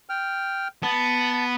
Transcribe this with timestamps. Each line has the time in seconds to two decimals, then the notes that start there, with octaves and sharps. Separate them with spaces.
0.09 G5 F6
0.83 B3 A5